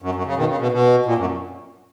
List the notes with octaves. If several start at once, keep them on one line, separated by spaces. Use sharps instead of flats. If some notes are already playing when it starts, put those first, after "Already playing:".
F#2
F#2
C#3
B2 D#3
C#3
B2
B2
A#2
F#2